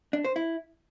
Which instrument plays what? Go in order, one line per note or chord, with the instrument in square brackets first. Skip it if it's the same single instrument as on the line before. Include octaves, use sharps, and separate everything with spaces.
[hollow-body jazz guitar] D4
C5
E4